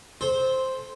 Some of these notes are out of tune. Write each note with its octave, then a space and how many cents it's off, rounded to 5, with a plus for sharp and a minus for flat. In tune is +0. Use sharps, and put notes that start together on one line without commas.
A4 -25 C5 +0